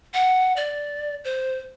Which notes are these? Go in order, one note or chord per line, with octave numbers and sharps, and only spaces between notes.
F#5
D5
C5